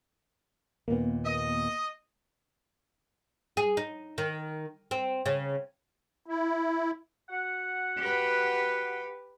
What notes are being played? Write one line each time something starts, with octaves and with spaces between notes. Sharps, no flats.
D#2 A#2 A#3 B3
D#5
G#4
D#4
D#3
C4
C#3
E4
F#4 F#5
G4 B4